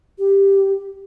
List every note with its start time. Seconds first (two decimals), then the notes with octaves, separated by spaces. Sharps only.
0.19 G4